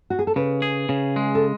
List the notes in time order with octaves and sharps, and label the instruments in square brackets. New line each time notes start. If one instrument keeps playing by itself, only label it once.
[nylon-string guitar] F#4
G#4
A4
[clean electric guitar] C#3 [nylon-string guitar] B4
[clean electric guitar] G#4
C#3
G#3
[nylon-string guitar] A4